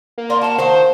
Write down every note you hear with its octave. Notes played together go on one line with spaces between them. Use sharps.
A#3
A#4 D5 F5 C6
F#4 F5 A5
D#3 F4 F#4 C5